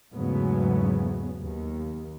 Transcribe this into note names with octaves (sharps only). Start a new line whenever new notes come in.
E2 G#2 C#3 F#3 A3 B3
D#2